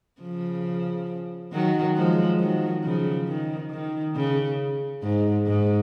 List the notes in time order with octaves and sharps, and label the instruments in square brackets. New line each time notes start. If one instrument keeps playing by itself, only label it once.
[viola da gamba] C#3 F3
D#3 F#3
F3 G#3
D#3 F#3
C#3 F3
D#3
D#3
C#3
G#2
G#2